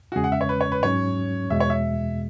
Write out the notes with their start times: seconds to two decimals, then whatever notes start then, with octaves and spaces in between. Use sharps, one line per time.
0.12 F#4
0.15 E2 C#3 G#3 C#4 G#4
0.24 F#5
0.32 E5
0.41 C#5
0.49 B4
0.61 C#5
0.72 B4
0.83 G#2 F#3 C#4 C#5
1.50 E2 B2 G#3 E5
1.60 C#5
1.70 E5